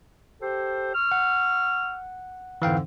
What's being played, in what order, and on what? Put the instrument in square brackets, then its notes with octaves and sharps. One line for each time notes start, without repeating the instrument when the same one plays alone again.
[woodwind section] G4 A4 C5
C#6 E6 F6
[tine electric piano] F#5
[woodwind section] F2 G#2 D3 [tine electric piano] E3 F5 G5